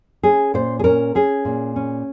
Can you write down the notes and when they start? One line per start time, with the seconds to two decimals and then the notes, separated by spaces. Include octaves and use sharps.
0.23 C#4 G#4
0.54 A#2 C5
0.79 G#4
0.84 C#4 A#4
1.15 C#4 G#4
1.45 A#2
1.76 C#4